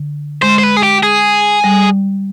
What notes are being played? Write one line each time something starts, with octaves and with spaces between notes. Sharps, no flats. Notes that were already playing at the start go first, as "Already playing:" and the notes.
Already playing: D3
G#3 C5
C5
B4
G#4
G4
G#4
G3